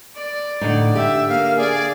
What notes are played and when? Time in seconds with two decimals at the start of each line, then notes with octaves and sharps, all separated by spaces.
0.16 D5
0.61 A2 D3 D#4
0.95 G4 E5
1.28 A#3 F5
1.58 G#4 D5 G#5